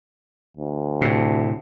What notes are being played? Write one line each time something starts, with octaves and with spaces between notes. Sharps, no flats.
D2
A2 C3